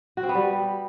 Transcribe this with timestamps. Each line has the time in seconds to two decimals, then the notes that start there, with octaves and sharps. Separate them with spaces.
0.17 F#4
0.23 C4
0.29 B3
0.35 G3